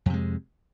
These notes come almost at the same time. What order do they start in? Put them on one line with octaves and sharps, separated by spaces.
F2 C3 G#3